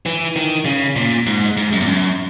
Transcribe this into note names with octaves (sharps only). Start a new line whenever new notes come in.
E3
D#3
C#3
A#2
G#2
G#2
F#2
E2
F#2